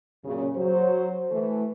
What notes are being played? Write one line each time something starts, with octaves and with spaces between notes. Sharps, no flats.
F#2 A#2 C#3
F#3 C5
E3 A3